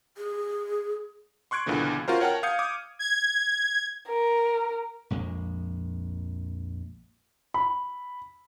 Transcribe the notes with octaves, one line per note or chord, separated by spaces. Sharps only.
G#4
C6 C#6 F#6 G#6 D7
C#2 A#2 D3 E3 B3
C#4 F4 F#4 A#4 C5
A#4 C#5 F#5 G5 A5 F6
F5 D#6 G6 G#6 C#7
D6 D#6 G#6
G#6
A#4
A#1 F2 G#3 A#3
B5